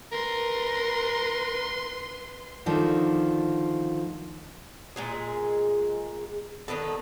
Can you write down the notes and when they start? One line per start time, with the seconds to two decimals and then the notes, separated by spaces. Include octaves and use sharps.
0.12 A#4 B4 C6
2.66 D2 D#3 F3 D4
4.96 A#2 G#3 G#4
6.68 D3 D#3 B3 A4